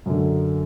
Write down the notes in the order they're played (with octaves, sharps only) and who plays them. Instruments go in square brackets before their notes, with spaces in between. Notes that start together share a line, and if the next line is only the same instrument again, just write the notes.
[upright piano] F#2 D3